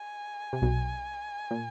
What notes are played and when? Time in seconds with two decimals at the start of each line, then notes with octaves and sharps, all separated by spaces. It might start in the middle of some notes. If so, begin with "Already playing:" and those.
Already playing: G#5
0.53 C3
0.62 B1 B2
1.51 A#2